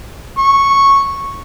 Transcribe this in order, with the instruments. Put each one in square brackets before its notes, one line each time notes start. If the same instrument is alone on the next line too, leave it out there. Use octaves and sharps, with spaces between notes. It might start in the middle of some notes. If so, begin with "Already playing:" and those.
[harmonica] C#6